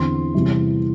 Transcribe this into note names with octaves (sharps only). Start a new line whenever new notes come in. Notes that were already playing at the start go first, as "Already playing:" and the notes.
Already playing: E2 D3 C4 C6
E2 C3 G3 E4